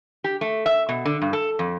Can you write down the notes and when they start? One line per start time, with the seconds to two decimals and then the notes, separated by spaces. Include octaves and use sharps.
0.24 G4
0.41 A3
0.66 E5
0.89 B2
1.05 D3
1.22 G2
1.33 A4
1.59 F2